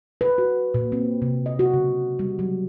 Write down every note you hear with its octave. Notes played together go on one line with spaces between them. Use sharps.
B4
F#4
A#2
C4
C3
D#5
F#4
C#3
G3
F#3